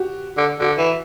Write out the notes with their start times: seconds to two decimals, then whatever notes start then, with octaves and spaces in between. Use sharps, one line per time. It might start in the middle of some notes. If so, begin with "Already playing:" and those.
Already playing: F#4 G4
0.38 D3
0.60 D3 F#4
0.78 E3